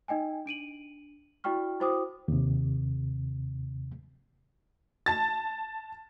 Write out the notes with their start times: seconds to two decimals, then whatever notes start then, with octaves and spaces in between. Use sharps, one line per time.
0.08 D#4 D#5 G5 G#5
0.46 D4 D7 D#7 F#7
1.44 E4 F#4 D5 G5 C#6 F6
1.80 E4 F#4 C5 G5 D6 D#6
2.28 D#2 C3
5.06 A5 A6